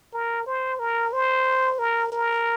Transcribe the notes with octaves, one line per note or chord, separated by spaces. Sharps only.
A#4
C5
A#4
C5
A#4
A#4